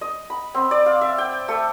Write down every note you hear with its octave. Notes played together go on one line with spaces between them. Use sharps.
D#5
B5
C4
D5
F5
E5
G5
A3